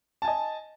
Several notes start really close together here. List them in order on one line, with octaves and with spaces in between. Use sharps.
A5 G#5 D#5